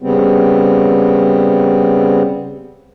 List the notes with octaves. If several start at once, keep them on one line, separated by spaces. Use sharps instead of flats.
C#3 G3 B3 C4